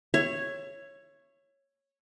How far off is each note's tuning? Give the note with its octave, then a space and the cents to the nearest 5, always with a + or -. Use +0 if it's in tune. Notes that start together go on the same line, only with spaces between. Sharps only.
C#5 -5 E5 +30